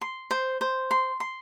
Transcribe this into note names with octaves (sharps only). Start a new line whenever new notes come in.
C6
C5
C5
C6
C6